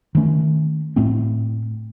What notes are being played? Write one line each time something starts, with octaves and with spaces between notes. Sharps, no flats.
D#3 A3 C#4
A2 A3 C4